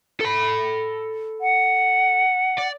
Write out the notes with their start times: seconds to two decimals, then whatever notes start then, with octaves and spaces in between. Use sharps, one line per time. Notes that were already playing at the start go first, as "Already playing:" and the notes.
0.21 A4 B5
1.41 F#5
2.58 D5